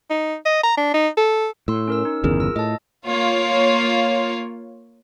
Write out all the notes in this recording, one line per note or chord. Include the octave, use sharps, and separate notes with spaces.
D#4
D#5
A#5
D4
D#4
A4
A2 C6 E6
C#4 A#4 E6
D#4
G1 E2 C#3 G#4 A#4
F4 E6
A2 D#5 A5
A#3 F4 C#5